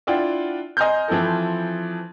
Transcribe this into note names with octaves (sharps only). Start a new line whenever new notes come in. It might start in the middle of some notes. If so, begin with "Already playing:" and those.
D4 E4 F4 F#5 G5
D#5 G#5 A#5 C6 F6 G6
E3 F3 C4 E4 A4